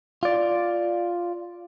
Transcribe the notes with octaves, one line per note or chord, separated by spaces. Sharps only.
F4 D5